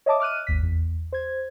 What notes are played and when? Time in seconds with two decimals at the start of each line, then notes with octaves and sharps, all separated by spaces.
0.06 C#5 D#5 E5 A5 D6 D#6
0.20 D6 F6 F#6 D#7
0.47 G#1 D#2 B6
0.63 E2
1.13 C5 G#6